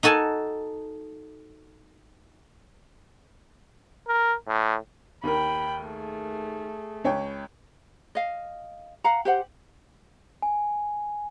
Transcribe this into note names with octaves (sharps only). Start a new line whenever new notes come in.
D#4 F#4 A4 G#5 A5
A#4
A2
D#2 A#4 G5 B5
A3 G#4
C#2 C#5 G5
D#5 F5
F5 F#5 A#5
G4 C5 F#5
G#5